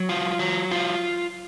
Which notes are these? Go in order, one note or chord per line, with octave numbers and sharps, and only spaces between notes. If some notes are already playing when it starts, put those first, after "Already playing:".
Already playing: F#3
F4
F#3
F4